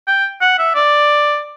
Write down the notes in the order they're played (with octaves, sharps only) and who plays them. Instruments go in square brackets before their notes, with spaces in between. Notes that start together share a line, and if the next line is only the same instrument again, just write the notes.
[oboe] G5
F#5
E5
D5